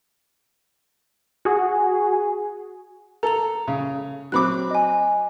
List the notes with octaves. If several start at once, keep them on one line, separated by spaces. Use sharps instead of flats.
F#4 G#4
A4 A#5 F7
C#3
F#3 C4 B5 D6 F#6
D#5 G#5